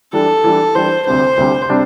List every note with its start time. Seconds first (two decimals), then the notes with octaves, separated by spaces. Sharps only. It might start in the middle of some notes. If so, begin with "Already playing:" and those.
0.13 E3 G3 D4 A4
0.44 E3 G3 D4
0.75 E3 G3 D4 C5
1.06 D2 C3 G3 D4 C5
1.37 D2 C3 G3 D4
1.69 C3 G3 D4